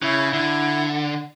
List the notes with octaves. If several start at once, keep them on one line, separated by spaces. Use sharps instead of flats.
C#3 E4
D3 E4